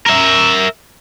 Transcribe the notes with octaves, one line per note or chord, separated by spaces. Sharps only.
A#4 E5